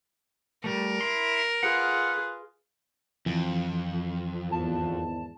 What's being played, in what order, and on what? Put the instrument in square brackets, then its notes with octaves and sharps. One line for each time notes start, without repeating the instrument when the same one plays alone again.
[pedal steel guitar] G3 A3 [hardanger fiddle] A#4
[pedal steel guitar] E4 C6
[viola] F4 G#4 [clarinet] B4 [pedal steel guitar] F#5
[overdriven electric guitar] F2 [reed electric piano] E3
[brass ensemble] G#1 E2 [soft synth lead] A5